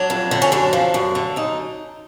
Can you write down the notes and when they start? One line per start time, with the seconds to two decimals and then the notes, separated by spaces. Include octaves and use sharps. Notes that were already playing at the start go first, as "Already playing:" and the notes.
Already playing: F#3 D4
0.10 F2
0.31 D3
0.42 C#4
0.52 F#2 D4
0.73 F3
0.94 F#2
1.15 D3
1.36 F#2 D#4